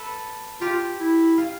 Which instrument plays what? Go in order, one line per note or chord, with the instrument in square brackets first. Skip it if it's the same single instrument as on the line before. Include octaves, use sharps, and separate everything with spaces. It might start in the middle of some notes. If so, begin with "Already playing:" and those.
Already playing: [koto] A4 B4
[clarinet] F4 [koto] G4
[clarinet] E4
[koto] F4